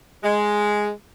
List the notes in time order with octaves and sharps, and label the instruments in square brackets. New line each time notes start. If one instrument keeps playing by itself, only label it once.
[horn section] G#3